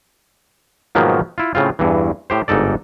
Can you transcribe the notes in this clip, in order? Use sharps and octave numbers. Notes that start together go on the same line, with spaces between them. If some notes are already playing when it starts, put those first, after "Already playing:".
G#2 B2 D#3 F3 F#3 A#3
E4 F4
A2 C#3 C4 F4
E2 G2 E3
A2 G4 C5
G1 G#2 D#4 A4 D5